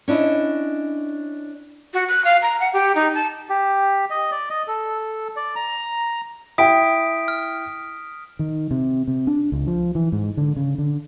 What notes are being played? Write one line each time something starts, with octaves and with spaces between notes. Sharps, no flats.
C#4 D4 E4 D#5
F#4
F#6
F5
A#5
F#5
G4
D#4
A5
G4
D#5
D5
D#5
A4
D5
A#5
E4 G5 D#6 B6 D7
F6
D#3
C3
C3
D4
C#2
F3
E3
G#2
D3
C#3
D3